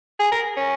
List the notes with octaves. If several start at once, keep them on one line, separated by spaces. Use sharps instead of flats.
G#4
A#4
C#4